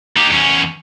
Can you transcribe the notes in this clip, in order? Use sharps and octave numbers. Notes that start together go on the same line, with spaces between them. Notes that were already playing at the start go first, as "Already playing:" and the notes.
D#4 G4
E2 C#4